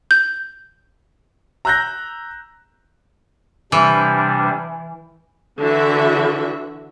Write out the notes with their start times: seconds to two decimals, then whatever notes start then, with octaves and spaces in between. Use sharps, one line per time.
0.11 G6
1.65 A#5 E6 F#6 G6 A#6
3.72 C3 E3 G3 D4
5.59 D3 E3 F#4 E5